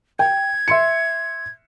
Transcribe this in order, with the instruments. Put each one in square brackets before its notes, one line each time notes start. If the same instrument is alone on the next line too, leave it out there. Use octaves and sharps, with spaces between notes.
[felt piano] G5 [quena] G#6
[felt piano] E5 C6 C#7